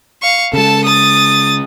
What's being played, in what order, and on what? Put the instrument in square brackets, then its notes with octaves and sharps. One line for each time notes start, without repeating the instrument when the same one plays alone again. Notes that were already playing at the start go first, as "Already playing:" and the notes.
[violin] F5 C#6
[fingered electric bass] C#3 G#3 [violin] A4 A5
[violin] D#6 A6